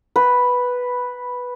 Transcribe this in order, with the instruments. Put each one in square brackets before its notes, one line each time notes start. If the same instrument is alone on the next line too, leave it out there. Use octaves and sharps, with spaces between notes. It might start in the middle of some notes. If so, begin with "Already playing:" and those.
[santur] B4